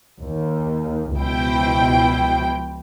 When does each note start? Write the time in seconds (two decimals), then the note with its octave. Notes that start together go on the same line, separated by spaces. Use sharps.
0.23 D#2
1.16 C#2 B2 F3 E4 G5